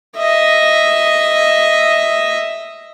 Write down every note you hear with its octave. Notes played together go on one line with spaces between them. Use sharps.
D#5 E5